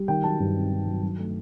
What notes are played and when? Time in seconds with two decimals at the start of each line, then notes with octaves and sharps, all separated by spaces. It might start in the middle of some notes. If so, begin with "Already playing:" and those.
Already playing: G3
0.08 D#3 G5
0.24 F#3 A5
0.40 G2
0.56 C4
0.72 D#3
0.87 F#3
1.03 F#3
1.18 A3